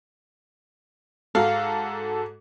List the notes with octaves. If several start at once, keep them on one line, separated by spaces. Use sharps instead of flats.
G#2 F#4 A4 F5 A#5